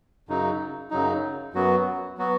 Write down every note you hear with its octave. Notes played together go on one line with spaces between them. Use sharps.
F#2 C#3 F#3 D#4
F#2 C#3 F#3 D#4
F#2 F#3 B3 F#4
F#3 B3 F#4